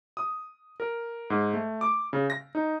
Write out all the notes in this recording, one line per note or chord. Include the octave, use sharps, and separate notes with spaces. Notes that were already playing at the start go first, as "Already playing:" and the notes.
D#6
A#4
G#2
A3
D6
C#3
A#6
D#4